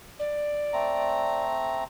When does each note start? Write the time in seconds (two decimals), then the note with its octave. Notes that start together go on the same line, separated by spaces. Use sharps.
0.19 D5
0.73 A3 C4 A#5